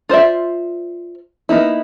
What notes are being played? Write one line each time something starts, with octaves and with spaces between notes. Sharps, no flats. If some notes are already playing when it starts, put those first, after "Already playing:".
F4 C5 D5 E5
A#3 B3 D#4 E4